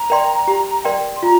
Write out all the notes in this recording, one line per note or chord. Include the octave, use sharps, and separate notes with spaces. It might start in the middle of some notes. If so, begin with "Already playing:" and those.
Already playing: A#5
A#4 D5 G5 C6
G4
A#4 D5 G5 C6
C6
F4 A#5